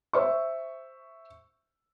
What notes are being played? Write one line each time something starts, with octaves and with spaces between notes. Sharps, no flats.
C5 E5 C#6